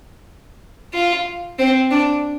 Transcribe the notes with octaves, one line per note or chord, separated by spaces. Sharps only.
F4
C4
D4